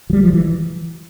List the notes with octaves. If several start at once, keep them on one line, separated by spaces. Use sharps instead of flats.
F3
G3
F3
E3